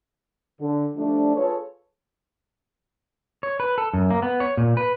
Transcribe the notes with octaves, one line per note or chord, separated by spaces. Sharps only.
D3
F3 G3 A3 D4
F4 G#4 A4 B4 C#5
C#5
B4
A4
F#2
A#3
B3
C#5
A#2
B4